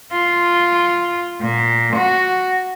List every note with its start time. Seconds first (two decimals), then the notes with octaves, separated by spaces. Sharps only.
0.12 F4
1.42 A#2
1.97 F#4